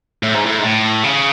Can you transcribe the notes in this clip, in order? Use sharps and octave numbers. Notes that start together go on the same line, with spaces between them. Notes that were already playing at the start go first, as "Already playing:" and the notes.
A2
G#2
A2
G#2
A2
C#3